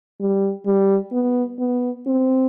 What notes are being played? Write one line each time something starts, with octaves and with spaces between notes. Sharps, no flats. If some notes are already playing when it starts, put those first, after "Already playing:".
G3
G3
B3
B3
C4